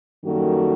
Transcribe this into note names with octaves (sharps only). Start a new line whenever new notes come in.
F#2 D#3 G3 A#3 F#4 A4